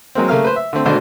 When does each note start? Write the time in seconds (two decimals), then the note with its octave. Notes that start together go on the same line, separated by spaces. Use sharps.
0.15 F#3 G#3 A#3 C4
0.28 C#3 A3 A#3 F5 F6
0.44 B4 C5
0.56 E5
0.73 D3 A3 C4
0.85 G#1 B2 D3 A3 D4 C5